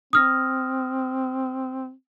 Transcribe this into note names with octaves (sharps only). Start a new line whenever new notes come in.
C4 D#6 F6 A#6